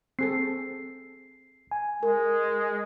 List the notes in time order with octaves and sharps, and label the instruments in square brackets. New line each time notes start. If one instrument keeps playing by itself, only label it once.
[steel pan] C4 G#4 A4 [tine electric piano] C7
[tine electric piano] G#5
[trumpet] G#3 [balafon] A#4